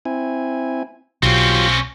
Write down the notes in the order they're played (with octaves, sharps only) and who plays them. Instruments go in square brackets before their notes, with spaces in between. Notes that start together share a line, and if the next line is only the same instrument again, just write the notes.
[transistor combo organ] C4 E4 G#5
[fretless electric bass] B1 [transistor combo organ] F#3 F4 G4 [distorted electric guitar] C4 C#4